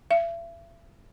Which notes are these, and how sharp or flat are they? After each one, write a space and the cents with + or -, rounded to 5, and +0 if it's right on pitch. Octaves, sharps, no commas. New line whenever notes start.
E5 +40